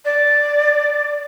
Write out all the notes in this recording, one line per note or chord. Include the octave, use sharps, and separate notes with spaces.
D5